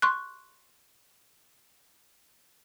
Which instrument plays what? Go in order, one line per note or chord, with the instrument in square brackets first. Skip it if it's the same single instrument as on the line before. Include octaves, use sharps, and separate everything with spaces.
[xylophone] C6 C#6 F#6